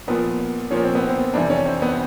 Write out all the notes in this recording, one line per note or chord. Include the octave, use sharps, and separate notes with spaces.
A#2 F3 B3
A#2 F3 C#4
C4
B3
C4
F2 C3 E3 D4
C#4
C4
B3